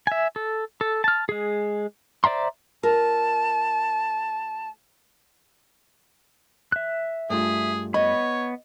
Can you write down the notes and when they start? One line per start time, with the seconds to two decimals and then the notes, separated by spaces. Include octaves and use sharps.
0.07 E5 G#5
0.36 A4
0.81 A4
1.04 A5 F6
1.29 G#3 G#4
2.24 C5 D5 E5 A#5 C6
2.83 A3 F4 A#4 A5
6.72 E5 F#6
7.30 G2 A3 F4 G#4
7.94 B3 C#5 D#5 B5